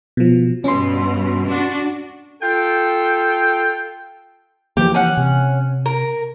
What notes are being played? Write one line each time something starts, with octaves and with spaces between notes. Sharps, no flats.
B2 F3
G2 B2 C#4 C6
D4 F#4
F4 A4 G5
E3 F3 A#3 G4
C#4 F#5
C3
A#4